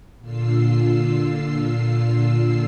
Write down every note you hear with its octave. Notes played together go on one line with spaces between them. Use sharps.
A#2 D3 F4 E6 C7